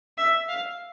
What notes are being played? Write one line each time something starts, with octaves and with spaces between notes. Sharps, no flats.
E5
F5